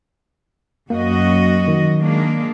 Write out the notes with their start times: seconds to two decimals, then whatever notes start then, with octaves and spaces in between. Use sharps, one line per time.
0.90 F#2 A#3 F#4 D#5
1.68 D#3
2.01 G#3 A#3 D4